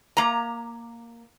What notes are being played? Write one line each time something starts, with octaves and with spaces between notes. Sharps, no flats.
A#3 A#5